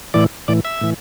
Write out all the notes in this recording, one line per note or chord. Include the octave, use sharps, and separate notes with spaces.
A2 E3 D5
A2 E3 D5
E5
A2 E3